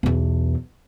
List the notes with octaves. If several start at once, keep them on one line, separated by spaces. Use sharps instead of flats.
B1 E2